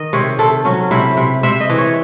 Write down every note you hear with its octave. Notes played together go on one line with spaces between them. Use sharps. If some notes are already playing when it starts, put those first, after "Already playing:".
Already playing: D#3 D#5
C3 C#5
C3 A4
F#3 C#4
C3 E4
C3
C3 E5
D#5
E3
C#5